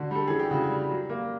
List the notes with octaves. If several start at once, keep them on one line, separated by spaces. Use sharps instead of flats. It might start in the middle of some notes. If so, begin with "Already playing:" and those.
Already playing: D3 F#4
G3 A4
E3 G#4
G4
C#3 F#4
G3
F#3
A#3